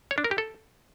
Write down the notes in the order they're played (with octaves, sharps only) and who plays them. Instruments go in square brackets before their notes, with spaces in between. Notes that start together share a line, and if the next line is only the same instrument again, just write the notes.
[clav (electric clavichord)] C#5
D4
A#4
G4
A4